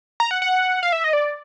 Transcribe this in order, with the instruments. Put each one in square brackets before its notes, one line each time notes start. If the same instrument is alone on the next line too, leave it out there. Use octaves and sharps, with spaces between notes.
[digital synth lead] A#5
F#5
F#5
F5
E5
D#5
D5